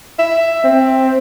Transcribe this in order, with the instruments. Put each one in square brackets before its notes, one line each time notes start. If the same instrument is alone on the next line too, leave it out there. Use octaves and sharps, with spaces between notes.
[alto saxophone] E5
C4